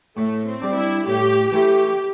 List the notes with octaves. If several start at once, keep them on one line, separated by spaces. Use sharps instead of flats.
A2 A3
C4
G3 D4
E4
A2 G4
E3 A3 E4 G4